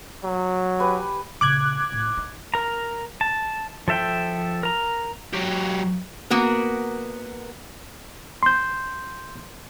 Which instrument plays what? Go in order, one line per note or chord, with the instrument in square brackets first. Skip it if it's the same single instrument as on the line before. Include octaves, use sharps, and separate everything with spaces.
[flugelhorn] F#3
[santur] G4 B4 G#5
[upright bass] A#2 C#3 [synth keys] D6 F#6 G#6
[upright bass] A2
D#4
[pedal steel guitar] A#4 A#5
A5
F3 A4 E5 G5
A#4 A#5
[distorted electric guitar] F#3 G4
[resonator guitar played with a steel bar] A#3 B3 F#4 A#4
[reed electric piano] C6 G6